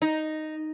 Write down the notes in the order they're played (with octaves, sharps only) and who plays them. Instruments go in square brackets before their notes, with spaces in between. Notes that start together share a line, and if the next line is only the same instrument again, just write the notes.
[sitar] D#4